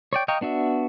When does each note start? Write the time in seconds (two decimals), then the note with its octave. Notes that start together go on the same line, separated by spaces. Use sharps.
0.13 C#5 D5 G5
0.28 D#5 F5 G5 A#5 C#6
0.41 B3 D4 F#4 E5